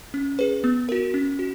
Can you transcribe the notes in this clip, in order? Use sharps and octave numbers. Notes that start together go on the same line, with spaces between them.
C#4
G#4 B4
B3
F#4 A#4
C#4
F#4